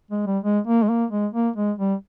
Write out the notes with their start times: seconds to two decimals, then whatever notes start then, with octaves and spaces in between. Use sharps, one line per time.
0.11 G#3
0.27 G3
0.43 G#3
0.67 A#3
0.83 G#3
0.89 A#3
1.11 G#3
1.34 A#3
1.56 G#3
1.78 G3